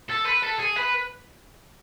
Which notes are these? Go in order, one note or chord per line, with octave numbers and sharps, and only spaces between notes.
A4
B4
A4
G#4
B4